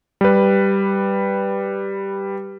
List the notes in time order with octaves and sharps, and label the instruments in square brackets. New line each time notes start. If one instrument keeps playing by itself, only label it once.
[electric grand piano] G3 B4